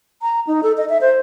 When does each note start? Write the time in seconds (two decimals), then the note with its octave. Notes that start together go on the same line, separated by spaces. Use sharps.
0.22 A#5
0.47 D#4
0.63 A4
0.78 D#5
0.89 E5
1.01 C5